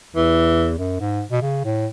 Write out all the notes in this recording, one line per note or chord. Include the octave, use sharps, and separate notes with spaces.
E2 E3
F#2
G#2
B2
C#3
A2